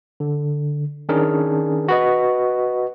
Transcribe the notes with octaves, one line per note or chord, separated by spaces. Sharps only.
D3
D#3 C#4 D4 G#4 A#4
F#4 B4 D#5